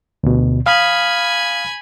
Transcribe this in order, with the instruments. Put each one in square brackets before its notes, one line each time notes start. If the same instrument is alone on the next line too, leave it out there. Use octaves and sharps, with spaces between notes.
[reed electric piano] D2 B2
[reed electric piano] F5 D#6 F6 [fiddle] G#5 B5